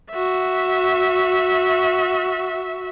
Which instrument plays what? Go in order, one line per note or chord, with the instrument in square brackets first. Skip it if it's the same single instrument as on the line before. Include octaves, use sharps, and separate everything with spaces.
[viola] F#4 E5